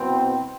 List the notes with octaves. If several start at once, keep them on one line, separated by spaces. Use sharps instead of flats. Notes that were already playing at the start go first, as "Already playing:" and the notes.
Already playing: C2 B2 B3 C4